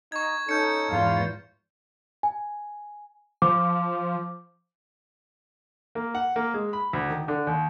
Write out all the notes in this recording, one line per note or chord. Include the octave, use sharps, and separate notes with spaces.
D#4 C#6 G#6
C#4 D#4 A4 G6 C#7
E2 G#2 F4 F5
G#5
F3 D6
A#3
F#5
A#3
G#3
B5
D2
D#3
D3
D#2